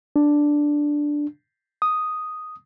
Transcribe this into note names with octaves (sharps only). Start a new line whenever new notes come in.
D4
D#6